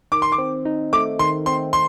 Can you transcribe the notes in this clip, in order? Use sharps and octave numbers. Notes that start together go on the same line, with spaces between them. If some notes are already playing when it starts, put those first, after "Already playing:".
D#3 D6
C6
D6
C4
D#4
A3 D6
D#3 C6
C4 C6
C6